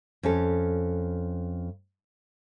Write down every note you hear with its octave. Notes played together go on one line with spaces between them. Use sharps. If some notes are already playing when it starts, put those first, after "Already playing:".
F2 C#4 A4